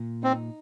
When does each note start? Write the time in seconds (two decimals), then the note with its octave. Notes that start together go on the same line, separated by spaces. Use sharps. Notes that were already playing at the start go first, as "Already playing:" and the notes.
Already playing: A#2
0.23 C4 D#4